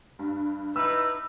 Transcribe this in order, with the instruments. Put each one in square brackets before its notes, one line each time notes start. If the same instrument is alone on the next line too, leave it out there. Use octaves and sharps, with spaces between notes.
[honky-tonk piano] G2
[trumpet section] D#4 E4 B4 [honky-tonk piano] E6